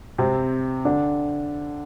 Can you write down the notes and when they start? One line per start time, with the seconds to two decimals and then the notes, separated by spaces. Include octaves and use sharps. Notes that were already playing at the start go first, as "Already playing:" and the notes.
0.18 C3 C4
0.85 D3 D4